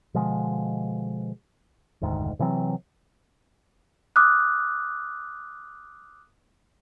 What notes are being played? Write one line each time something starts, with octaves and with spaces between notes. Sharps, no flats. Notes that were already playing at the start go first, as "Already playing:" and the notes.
B2 D3 F3 G#3
F1 D2 G#2 D#3
C3 E3 F#3 C4
D6 D#6 F6 F#6